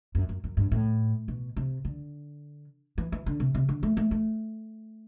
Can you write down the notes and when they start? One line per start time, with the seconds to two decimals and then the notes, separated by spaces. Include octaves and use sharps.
0.15 F#2
0.29 F#2
0.44 F#2
0.57 G2
0.72 A2
1.28 B2
1.56 C3
1.85 D3
2.98 E3
3.12 E3
3.26 D3
3.40 C3
3.54 C3
3.69 D3
3.83 A3
3.97 A3
4.11 A3